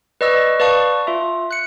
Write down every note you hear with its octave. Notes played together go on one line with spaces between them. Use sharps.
B4 D5 D#5 C#6 E6
B4 D5 F5 A5 C#6 D#6
F4 E5
F#6 C#7